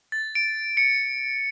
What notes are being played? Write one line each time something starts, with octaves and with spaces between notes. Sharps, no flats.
A6
D7
C#7